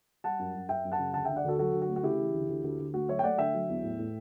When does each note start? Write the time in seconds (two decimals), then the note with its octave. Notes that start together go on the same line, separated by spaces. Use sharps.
0.24 G3 F#5 A5
0.39 F#2
0.55 F#2
0.69 F#2 E5 G5
0.85 F#2
0.92 F#5 A5
0.99 C#3
1.14 D2 F#5 A5
1.25 D3 E5 G5
1.36 D5 F#5
1.44 D2 F#4 A4
1.58 F#3 F#4 A4
1.73 D2
1.82 F#4
1.89 A3
1.96 F#4
2.03 C#3 E4 G4
2.19 E3
2.34 D2
2.49 D2
2.64 D2
2.79 D2
2.93 A3 F#4
3.08 F#3 C#5 E5
3.19 G5
3.24 A3 D5 F#5
3.38 D3 E5 G5
3.54 F#3
3.69 E2
3.83 A2
3.99 A2